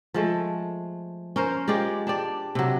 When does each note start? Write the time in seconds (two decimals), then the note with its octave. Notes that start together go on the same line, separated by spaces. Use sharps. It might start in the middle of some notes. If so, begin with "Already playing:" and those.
0.14 F3 G#3 A3
1.36 C#4 A#4 C5
1.68 G#3 F4 G4 D5
2.07 D4 G4 D5
2.55 C3 F#3